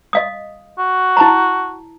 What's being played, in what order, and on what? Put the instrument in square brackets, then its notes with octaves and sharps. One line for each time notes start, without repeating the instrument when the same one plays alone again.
[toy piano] D#5 F5 D#6
[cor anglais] F#4
[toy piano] E4 A5 A#5